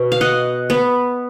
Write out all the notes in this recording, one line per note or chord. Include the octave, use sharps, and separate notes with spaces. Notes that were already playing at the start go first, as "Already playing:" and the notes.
Already playing: B2
F5
D#5 F#5
B3